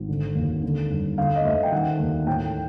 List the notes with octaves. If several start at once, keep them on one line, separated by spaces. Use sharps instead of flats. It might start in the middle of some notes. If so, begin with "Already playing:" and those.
Already playing: G#1
D3
D#2
D3
G2
D3 F5
D#5
D2 E5
G5
D#3 F#5
D#2
A2 G5